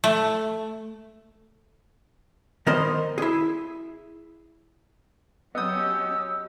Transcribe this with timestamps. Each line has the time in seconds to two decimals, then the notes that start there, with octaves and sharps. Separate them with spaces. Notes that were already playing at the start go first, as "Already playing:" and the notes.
0.04 A3
2.67 D#3 B3 A#4 C5 D#5
3.18 E4 G#4
5.55 F#3 B3 C#4 G4 D#5 D#6 E6 G6